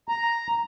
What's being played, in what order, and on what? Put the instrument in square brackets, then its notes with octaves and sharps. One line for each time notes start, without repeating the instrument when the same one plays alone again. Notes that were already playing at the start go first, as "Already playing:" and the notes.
[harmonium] A#5